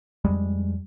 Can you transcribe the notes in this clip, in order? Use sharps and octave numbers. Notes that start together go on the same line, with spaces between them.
F2 G3 G#3